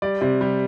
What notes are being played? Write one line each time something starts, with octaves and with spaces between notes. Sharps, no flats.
G3 D5
C3 D5
G3